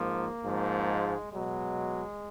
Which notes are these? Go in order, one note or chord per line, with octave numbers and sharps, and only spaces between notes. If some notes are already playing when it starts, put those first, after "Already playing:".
Already playing: G#2 F3 A#3
G#2 F3
G#3
B2 F#3 G#3